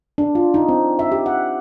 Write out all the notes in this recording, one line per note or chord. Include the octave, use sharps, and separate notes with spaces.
D4
F4
D#4
C4
E5
G4
F#5